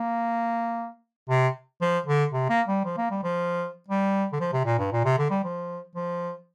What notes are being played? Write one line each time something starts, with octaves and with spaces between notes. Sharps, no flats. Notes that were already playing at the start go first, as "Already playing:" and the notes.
Already playing: A#3
C3
F3
D3
C3
A#3
G3
F3
A#3
G3
F3
G3
D3
F3
C3
A#2
G2
A#2
C3
D3
G3
F3
F3